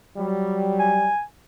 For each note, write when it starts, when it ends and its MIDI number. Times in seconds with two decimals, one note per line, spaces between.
0.17 1.11 54
0.17 1.11 55
0.80 1.22 80